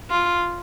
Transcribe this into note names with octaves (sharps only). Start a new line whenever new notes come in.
F4